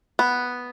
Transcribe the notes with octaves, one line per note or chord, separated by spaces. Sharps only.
B3